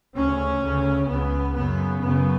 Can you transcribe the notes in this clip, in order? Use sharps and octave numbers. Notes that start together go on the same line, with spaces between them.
D2 C#3 C#4
D2 C#3
C#2 C#3 B3
F#2 C#3 B3
F#2 C#3 B3